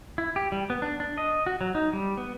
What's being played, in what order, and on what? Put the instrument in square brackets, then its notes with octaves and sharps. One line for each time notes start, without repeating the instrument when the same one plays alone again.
[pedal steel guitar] E4
G4
G3
B3
D4
D4
D#5
F#4
F#3
D#4
G3
B3